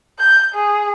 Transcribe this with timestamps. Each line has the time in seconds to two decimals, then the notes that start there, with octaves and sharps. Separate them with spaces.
0.19 G6
0.55 G#4